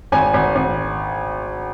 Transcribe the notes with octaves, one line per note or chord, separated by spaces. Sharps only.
G#1 G#5
G#1
G#1